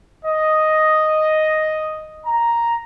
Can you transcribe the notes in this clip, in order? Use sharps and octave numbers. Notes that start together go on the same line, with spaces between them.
D#5
A#5